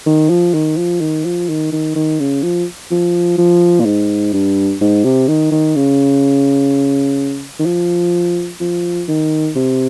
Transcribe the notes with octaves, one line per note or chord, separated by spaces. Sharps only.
D#3
F3
D#3
F3
D#3
F3
D#3
D#3
D#3
C#3
F3
F3
F3
A#2
G#2
G2
G#2
C3
D#3
D#3
C#3
D#3
F3
F3
D#3
C3